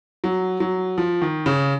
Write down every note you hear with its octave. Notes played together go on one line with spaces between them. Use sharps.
F#3
F#3
F3
D#3
C#3